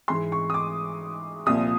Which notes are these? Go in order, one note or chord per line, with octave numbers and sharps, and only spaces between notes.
G#2 E3 G#3 C6
C#6
D#6
D6
C2 A#2 F3 D#6